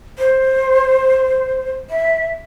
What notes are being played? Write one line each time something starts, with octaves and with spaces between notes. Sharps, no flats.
C5
E5